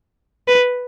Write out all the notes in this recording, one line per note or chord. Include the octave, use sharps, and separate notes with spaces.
B4